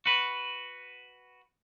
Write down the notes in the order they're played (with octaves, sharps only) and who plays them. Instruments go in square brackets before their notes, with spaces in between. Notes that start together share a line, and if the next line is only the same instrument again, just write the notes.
[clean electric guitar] F#4 B4